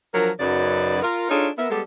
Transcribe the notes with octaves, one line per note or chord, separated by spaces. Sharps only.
F3 F#3 D4 A#4
F#2 C#3 F#3 D#4 B4 D5
F4 A#4
D4 D#4 F4 G#4 A4 C#5
B3 A#4 E5
G3 G#3 B3 G4 A4